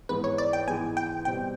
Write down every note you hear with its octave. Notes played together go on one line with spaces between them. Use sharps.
G#2 E3 G#3 B3 B4
C#5
D5
G5
G#2 E3 G#3 B3 G#5
G5
B2 G3 C4 G5